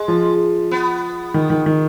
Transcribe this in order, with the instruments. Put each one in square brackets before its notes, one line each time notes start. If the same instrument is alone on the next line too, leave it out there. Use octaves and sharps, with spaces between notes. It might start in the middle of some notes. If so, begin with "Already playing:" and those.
Already playing: [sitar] G#3
[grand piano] F3
[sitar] B3
[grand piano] D#3
D#3
D#3